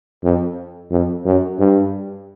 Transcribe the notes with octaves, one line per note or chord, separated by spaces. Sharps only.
F2
F2
F#2
G2